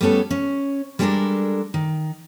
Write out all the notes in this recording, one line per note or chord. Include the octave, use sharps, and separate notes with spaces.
G3 A3 B3 C#4 A4
C#4
G3 G#3 D4 G4 A4 A#4
D#3